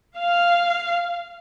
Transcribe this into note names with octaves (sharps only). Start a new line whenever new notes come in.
F5